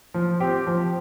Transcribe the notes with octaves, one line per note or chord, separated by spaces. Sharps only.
F3
C4 G4
F3